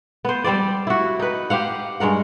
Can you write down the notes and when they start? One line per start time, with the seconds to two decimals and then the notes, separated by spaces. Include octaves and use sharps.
0.25 B3 C5
0.44 G3 C4 C5 D5
0.87 E4 F#4
1.19 D#4 B4
1.50 G4 C5 F5 F#5
2.00 G2 G#3 A#4 F#5